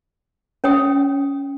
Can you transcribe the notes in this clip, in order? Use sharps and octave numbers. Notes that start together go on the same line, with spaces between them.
C#4 C#5 G5 D#6